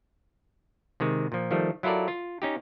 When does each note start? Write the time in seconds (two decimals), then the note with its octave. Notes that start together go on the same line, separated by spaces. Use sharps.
1.00 C3 D#3 G#3
1.32 A#2 F3
1.51 D#3 F3 G3 A3
1.83 F#3 E4 F4 A4 A#4 D5
2.08 F4
2.42 C#4 D#4 G4